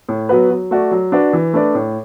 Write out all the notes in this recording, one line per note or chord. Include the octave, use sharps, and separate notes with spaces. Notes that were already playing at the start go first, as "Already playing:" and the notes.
A2
F#3 B3 F#4 B4
F#3
A3 F#4 D5
F#3
D4 F#4 B4 D5
E3
A3 D4 B4 D5
A2